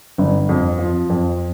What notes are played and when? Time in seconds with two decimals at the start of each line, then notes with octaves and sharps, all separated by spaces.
0.18 G1
0.49 F2
0.79 F3
1.10 F2